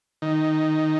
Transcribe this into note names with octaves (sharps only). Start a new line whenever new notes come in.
D#3